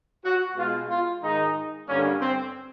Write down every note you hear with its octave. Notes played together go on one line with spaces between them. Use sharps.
F#4
B2 G#3 F4
F4
G#2 D#3 G#3 D#4
G2 D3 G3 A#3 C#4
C4